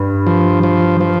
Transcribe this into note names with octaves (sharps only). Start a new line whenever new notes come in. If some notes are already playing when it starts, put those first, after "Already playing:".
Already playing: G2
F3
F3
F3